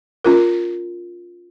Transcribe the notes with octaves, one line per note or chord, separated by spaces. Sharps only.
C#4 F4 A#4